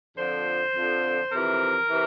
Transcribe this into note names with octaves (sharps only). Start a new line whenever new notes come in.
F2 D3 F3 C5
F2 D3 F3
F2 C3 E3 A#4
C3 E3